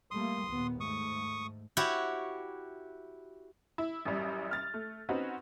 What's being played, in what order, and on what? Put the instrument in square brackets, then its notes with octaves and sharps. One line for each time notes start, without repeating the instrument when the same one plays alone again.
[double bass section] G3 A3 A#3 [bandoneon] C6 D#6
[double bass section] D#2 A#2 B3
[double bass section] G#2 A3 [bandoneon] C#6 D#6
[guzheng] E4 F#4 G4 C#5
[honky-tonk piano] E4
A1 F#2 G3
F6 A6
A3
C4 C#4 D#4 F#4 B4